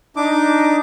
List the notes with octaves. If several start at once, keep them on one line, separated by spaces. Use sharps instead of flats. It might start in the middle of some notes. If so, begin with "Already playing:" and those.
D4 D#4 D6